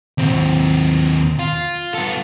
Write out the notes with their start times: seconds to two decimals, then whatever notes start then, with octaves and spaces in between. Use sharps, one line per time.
0.18 D#2 C4
1.39 F4
1.95 B3 A4